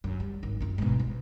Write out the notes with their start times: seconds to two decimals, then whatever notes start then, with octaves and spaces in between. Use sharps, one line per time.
0.04 F#2
0.20 G3
0.43 G#1
0.60 F#2 F4
0.78 G#2 B2
0.99 B1